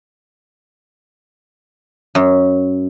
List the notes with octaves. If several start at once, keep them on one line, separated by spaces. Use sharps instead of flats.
F#2